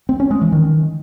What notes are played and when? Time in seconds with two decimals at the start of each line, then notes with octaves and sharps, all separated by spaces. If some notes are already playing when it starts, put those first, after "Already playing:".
0.09 C4
0.20 C#4
0.31 G#3
0.41 E3
0.52 D#3